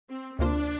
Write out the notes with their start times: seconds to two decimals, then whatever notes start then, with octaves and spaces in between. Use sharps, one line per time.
0.10 C4
0.39 D2 C3 A#3 D4 F4 C5